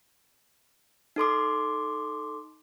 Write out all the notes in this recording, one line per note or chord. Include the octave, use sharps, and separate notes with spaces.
D#4 A4 C6 D6